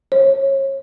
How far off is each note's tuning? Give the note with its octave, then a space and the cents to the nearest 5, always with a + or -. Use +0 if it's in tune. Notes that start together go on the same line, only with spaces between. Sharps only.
C#5 -30